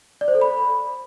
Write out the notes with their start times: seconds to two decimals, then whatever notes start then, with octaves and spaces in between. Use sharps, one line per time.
0.21 D5
0.28 C5
0.35 A4
0.41 B5